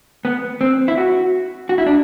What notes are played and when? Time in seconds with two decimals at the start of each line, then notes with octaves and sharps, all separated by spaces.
0.25 B3
0.61 C4
0.88 E4
0.98 F#4
1.69 F#4
1.78 E4
1.86 D4